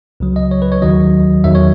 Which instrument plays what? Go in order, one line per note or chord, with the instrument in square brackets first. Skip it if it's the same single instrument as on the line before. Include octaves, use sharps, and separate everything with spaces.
[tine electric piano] C#2 C#3 F#3
D#5
C#5
B4
C#5
D#2 D#3 F#3 D#5
E2 D#3 F#3 E5
C#5